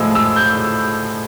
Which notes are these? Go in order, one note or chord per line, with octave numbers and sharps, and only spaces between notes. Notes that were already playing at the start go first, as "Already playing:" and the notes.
Already playing: A2 F3 G#3 E6
E6
G6